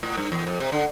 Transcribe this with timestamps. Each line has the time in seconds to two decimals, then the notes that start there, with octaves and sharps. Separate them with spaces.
0.03 A2
0.17 G2
0.32 E2
0.47 F2
0.60 C3
0.72 D3